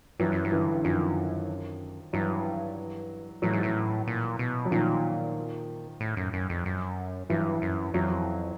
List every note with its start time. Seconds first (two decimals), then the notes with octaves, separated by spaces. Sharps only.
0.20 G2 E3 F#3
0.32 F#2
0.45 G2
0.52 D3 E3
0.84 F#2 D#3 F3
2.13 G2 E3 F#3
3.42 A2 E3 F#3
3.53 G#2
3.63 A2
4.07 A#2
4.39 B2
4.65 F#3
4.71 A#2 D#3 F3
6.00 A2
6.17 F#2
6.33 F#2
6.49 F2
6.65 F#2
7.30 G2 E3 F#3
7.62 F#2
7.94 F2 E3 F#3